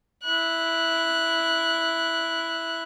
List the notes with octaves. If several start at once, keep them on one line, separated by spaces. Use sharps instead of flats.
E4 F#6